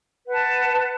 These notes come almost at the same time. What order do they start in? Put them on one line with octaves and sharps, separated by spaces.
B4 F#5 A5